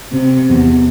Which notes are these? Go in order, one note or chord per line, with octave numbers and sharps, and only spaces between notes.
C3
E2